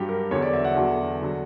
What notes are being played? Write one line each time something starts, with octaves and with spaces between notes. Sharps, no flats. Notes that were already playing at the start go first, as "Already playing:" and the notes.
Already playing: G2 F#3 G4
A#4
E2 D3 F#3 C#5
D5
E5
F#5
E2 D3 F#3
D3 F#3